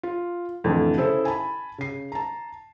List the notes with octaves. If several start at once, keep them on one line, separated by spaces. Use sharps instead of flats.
F4
F2 A2 D3 E3
C#3 E4 G#4 A4 C5
G#5 A5 B5
C#3 C7
A5 A#5